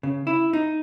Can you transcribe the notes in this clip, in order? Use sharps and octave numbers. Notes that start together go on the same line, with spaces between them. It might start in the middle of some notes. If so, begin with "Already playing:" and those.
C#3
E4
D#4